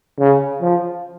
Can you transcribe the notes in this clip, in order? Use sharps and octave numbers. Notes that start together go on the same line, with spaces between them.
C#3
F3